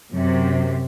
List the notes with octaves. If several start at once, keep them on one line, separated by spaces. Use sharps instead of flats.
F#2 C3